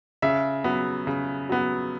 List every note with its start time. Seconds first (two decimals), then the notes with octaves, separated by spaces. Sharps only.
0.22 C#3 E5
0.64 F#3 B3
1.07 C#3
1.49 F#3 B3